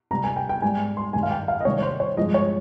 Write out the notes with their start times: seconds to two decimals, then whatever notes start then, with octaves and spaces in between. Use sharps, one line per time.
0.11 C3 G3 A#5
0.24 G#5
0.36 G5
0.49 G5
0.62 G#2 G3 G#5
0.97 C6
1.13 G2 D#3 G3 G#5
1.23 F5
1.31 G5
1.48 F5
1.61 D#5
1.65 C3 D#3 G3 C#5
1.78 C#5
1.82 C5
2.00 C#5
2.17 G2 F3 G#3 D#5
2.34 C#5